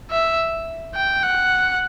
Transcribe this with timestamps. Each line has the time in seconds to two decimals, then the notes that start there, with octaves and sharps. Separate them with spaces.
0.10 E5
0.95 G5
1.23 F#5